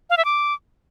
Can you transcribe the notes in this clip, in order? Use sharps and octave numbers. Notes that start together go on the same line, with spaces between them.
F5
E5
D6